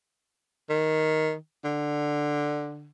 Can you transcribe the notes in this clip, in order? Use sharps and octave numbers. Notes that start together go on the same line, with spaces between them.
D#3
D3